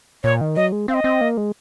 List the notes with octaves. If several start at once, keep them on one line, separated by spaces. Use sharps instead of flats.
A#2 C#5
D#3
F#3 D#5
G#3
C4 F5
D#5
C4
A#3
G#3